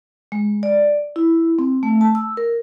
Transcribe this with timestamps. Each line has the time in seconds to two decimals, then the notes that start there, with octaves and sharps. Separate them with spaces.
0.32 G#3
0.63 D5
1.16 E4
1.59 C4
1.83 A3
2.01 A5
2.15 E6
2.37 A#4